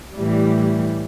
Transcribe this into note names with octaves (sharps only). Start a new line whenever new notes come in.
A2 E3 G3